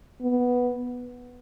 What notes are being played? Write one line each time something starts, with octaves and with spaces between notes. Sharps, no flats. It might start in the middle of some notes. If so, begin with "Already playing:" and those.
B3